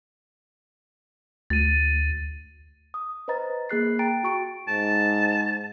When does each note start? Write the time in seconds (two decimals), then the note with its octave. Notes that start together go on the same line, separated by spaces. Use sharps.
1.50 D2 A6 D#7
2.94 D#6
3.28 B4 C5 D#5 A#5 A6
3.69 A#3 G#4 F#6 C7
3.99 G5 A#5 A6 D7
4.24 F#4 C#6 D7
4.68 G#2 A5